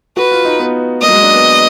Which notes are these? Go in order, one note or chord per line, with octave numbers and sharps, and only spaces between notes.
F#4 B4
F4
D#4
B3
A#3 D#5
F#3
G#3
D4
B3